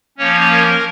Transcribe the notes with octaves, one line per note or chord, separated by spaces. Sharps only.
F3 A#3 C#4 C#5
A#4